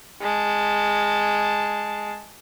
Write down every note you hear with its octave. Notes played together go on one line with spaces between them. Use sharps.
G#3 A5